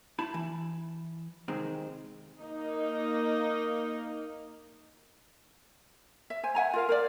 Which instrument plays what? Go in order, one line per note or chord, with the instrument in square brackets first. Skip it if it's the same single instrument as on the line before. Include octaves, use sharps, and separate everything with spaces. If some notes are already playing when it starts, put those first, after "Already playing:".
[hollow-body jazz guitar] E4 A5 B5
E3
C3 D#3 G#3 C4
[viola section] A#3 D#4
[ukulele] E5
C5 G#5
E5 F#5 G#5 A#5
F4 A#4 F5
A#4 C5 D5